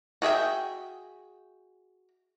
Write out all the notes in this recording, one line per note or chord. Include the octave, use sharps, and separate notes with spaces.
F#4 G#4 E5 G5